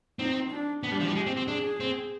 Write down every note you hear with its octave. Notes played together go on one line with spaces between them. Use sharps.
C4 D#4
D4
B3 D4
G3
F3
G3
G#3 G4
C4
C4
D4 G#4
C4